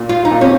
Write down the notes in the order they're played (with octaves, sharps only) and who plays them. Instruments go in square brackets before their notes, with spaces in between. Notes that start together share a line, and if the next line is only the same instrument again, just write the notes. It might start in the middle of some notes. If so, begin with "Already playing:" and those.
Already playing: [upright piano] A#2
[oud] F4
D#4
[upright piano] A#2
[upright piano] C3 [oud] C#4